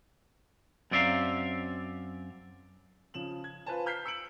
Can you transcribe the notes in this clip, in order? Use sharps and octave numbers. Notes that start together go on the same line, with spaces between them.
F#2 C4 D5 E5 F5 A#5
C#3 F3 E7 F#7
G#6
F4 B4 C5 G#5 A5
A#5 F6 G6 B6 C7
E6 C#7 D7 F#7